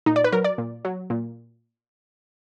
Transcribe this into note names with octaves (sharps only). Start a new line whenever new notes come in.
A#2 D#4
D5
B4
F#3 A#4
D5
A#2
F#3
A#2